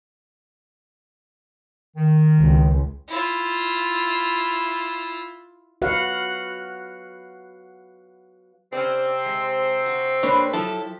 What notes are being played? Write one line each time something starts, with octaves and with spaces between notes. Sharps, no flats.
D#3
C#2
E4 F4
F#4 B4 F5 F#5
C3 C4 C#4 D5
G#3
F#4
A#3 D4 G4 B4 C#5
F3 F#3 E4 G4 A4